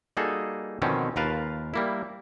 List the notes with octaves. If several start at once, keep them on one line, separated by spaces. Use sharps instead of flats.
G3 A#3 D#4 F#4 G#4 A4
B2 D3 D#3 F3 C4 C#4
D#2 F4 A#4 B4 F5 A5
G3 A#3 E4